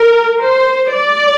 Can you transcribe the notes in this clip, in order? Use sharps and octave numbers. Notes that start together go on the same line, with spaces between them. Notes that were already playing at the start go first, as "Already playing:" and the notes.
Already playing: A#4
C5
D5